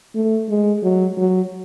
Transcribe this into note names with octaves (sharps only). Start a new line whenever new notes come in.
A3
G#3
F#3
F#3